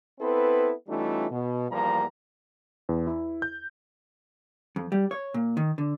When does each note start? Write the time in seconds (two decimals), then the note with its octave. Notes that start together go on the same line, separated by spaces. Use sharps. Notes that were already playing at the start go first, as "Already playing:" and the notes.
0.20 B3 C4 E4 A4 B4
0.88 E3 G3 A3 C#4 D#4 F4
1.31 B2
1.70 E2 F3 G3 A#3 A#5
2.89 E2
3.07 E4
3.42 G6
4.76 F2
4.92 G3
5.11 C#5
5.34 A#2
5.57 D#3
5.78 D3